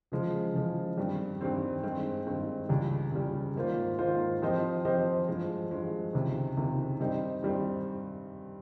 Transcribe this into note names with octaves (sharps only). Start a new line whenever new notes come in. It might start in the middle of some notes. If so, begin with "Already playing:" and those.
C#3 F3 G#3
C#3 F3 G#3
G2 D#3 G3 C4
G2 D#3 G3 C4
G2 D#3 G#3 C4
G2 D#3 G#3 C4
C#2 C#3 G3
C#2 C#3 G3
G#2 D#3 A#3 F4 C5
G#2 D#3 A#3 F4 C5
F3 C4 G4 C5 D#5
F3 C4 G4 C5 D#5
G2 F3 G#3
G2 F3 G#3
C#2 C3 D#3
C#2 C3 D#3
G2 G3 C4 D#4
G2 G3 C4 D#4